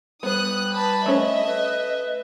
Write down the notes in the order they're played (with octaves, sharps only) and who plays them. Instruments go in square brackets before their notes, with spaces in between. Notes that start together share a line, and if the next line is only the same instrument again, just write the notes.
[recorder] G3 [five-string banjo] B3 C5 [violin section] D#6 F#6
[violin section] B4 A5 B5
[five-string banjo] A3 C#4 C5 [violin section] D#5 E5
[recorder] B4